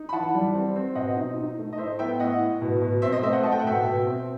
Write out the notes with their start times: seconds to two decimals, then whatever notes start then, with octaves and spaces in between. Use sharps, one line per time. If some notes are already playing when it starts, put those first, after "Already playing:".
Already playing: D#4
0.09 B5
0.13 E3 F#5 A5
0.34 G3
0.54 C4
0.76 C4
0.95 B2 D#5 F#5
1.17 D#4 D#5
1.38 D#4
1.58 A3
1.73 D#5
1.78 A2 C5 E5
1.99 B3 E5 G5
2.19 A2 D#5 F#5
2.40 A2
2.61 B2
2.81 B2
3.02 C4 C5 E5
3.12 D#5
3.22 A3 C5 E5
3.33 D#5 F#5
3.43 A3 A5
3.52 G5
3.59 F#5
3.64 B2 E5 G5
3.84 B2
4.06 C4